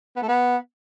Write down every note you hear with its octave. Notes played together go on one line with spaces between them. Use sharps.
B3
A3
B3